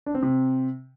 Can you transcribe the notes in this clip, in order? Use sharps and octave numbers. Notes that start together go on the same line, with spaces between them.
D4
C4
C3